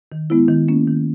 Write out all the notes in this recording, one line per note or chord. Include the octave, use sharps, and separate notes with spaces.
D#3
G#3 B3 E4
D#3
A#3 C#4
D#3